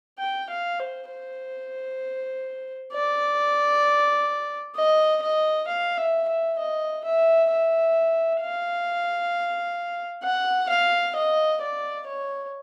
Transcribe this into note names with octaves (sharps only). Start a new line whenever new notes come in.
G5
F5
C5
C5
D5
D#5
D#5
F5
E5
E5
D#5
E5
E5
F5
F#5
F5
D#5
D5
C#5